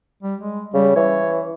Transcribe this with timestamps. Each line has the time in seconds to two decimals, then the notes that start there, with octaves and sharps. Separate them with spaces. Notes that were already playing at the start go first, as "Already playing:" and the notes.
0.23 G3
0.41 G#3
0.74 C#3 G3
0.96 E3 C#5